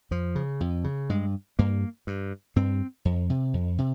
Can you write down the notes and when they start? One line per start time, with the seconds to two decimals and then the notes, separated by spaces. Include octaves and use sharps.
0.11 F2 F3
0.35 C#3
0.60 F2
0.84 C#3
1.09 G2 G#3
1.59 G2 A#3
2.07 G2
2.56 G2 C4
3.05 F2
3.30 C3
3.54 F2
3.78 C3